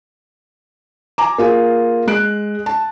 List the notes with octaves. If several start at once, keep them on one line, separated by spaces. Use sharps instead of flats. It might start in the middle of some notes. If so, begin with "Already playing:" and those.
G#5 A#5 D6
A#3 F4 G#4
G#3 F#6 D7
A5